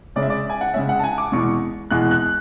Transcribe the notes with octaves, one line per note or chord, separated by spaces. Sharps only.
C#3 G#3 C#4 D5
E5
D5
G#5
F#5
C#3 G#3 C#4 E5
F#5
A5
G#5
D6
E2 B2 G#3 C#6
E2 B2 G#3 F#6
F#6